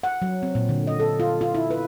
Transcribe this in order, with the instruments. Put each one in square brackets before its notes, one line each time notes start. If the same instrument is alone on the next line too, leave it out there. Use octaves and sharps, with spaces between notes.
[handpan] F#5
F#3
C4
A#2
D3
D#5
A4
F4
F4
E4
B4